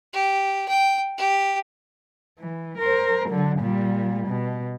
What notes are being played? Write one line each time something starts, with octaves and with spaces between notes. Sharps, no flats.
G4
G5
G4
E3
A#4 C5
D3 F#3
A#2 G3
B2